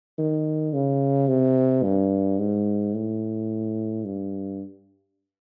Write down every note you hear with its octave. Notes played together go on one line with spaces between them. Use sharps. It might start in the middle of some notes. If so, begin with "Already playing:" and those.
D#3
C#3
C3
G2
G#2
A2
G2